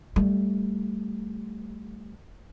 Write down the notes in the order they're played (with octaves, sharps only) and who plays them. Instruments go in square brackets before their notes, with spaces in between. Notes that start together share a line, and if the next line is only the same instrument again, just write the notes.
[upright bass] G3 A3